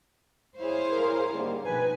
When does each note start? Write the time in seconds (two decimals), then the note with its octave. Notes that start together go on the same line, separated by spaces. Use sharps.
0.59 E4 G#4 C5 C#5 F5
0.92 A#4
1.34 G#2 D3 G3 A#3
1.65 B2 F3 D#4 B4 G#5